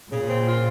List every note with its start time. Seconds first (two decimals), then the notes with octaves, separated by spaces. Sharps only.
0.09 A#2 C#3
0.27 C4
0.45 F4